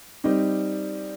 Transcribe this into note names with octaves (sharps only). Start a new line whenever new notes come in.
G3 C4 D#4 G4